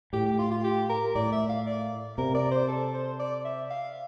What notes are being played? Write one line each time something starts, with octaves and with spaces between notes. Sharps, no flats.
A2 G4
G4
F4
F4
G4
A#4
A2 D5
E5
F5
D5
C3 A#4
D5
C5
A4
C5
D5
E5
F5